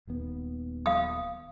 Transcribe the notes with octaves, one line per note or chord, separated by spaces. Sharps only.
D#1 D#2 B3
F5 D#6